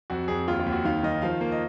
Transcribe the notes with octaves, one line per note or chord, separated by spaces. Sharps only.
F2 F#4
F2 G#4
D#2 F4
F4
D#2
F#4
D#3 F5
D#3 D#5
F3 F5
A#3
D#5